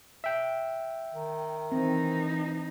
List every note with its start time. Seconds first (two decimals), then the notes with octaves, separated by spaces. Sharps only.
0.24 E5 G5
1.14 D#3
1.72 E3 C4 D#4